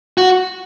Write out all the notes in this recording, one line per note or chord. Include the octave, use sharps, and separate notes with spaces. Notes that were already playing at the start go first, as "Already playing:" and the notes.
F#4